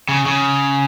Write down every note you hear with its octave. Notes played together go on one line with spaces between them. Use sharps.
C#3
C#3